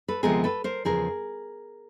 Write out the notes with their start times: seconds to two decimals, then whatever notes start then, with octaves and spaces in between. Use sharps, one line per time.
0.08 A4 B4
0.23 D2 C3 F3 G#3 B3 G#4 A#4
0.44 A4 B4
0.64 A#4 C5
0.85 E2 C#3 F3 G#4 A#4